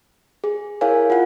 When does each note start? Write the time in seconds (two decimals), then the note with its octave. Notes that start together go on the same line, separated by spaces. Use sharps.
0.44 G#4
0.81 E4 G#4 A#4 C#5 F5 G#5
1.10 F4 F5 F#5